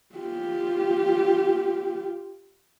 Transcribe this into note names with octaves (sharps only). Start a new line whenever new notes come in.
F4 G4